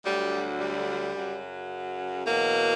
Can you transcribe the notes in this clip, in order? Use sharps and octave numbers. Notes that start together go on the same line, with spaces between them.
D2 D3 F#3 G3
G3
F#2 C#3 F#3
E2 B2 F#3 A#3